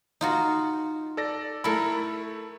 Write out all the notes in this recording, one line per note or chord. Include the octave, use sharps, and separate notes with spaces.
D#4 F4 F#4
A4 D5 A#6
A3 E4 A4 A#4 B5